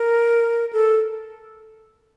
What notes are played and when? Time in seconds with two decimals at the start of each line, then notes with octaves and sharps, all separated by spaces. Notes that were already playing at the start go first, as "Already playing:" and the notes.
Already playing: A#4
0.73 A4